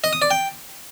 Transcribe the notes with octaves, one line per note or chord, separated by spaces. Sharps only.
D#5
D#6
D5
G5